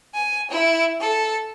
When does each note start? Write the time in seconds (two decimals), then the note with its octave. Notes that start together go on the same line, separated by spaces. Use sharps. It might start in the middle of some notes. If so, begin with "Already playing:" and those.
0.13 G#5
0.50 E4
0.99 A4